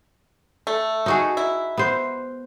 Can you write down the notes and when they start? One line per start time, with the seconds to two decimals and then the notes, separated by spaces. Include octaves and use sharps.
0.67 A3
1.06 D#4 F#4 G#4
1.37 E4
1.78 B3 C5